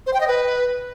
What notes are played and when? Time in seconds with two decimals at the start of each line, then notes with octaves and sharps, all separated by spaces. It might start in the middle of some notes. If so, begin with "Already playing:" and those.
0.06 C5
0.14 G5
0.21 D#5
0.28 B4